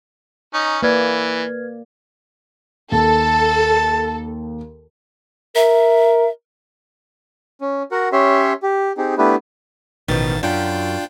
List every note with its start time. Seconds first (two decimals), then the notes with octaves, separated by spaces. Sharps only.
0.54 C#4 D#4
0.82 E3 A#3 B4 D5 F6 G#6
2.92 D#2 A4 A5
5.55 A#4 E5
7.61 C#4
7.91 F#4 A#4 F#5
8.12 C#4 G4 C#5 E5 C6
8.63 G4
8.97 C4 D#4 G4 G#4
9.18 A3 B3 D4 E4 G4 B4
10.08 A1 B2 D#3 F3 A6
10.43 F#2 D4 F4 G5